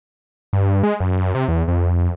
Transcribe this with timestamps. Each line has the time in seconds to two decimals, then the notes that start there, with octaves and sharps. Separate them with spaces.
0.53 G2
0.83 G#3
1.00 F#2
1.35 C3
1.48 E2
1.68 F2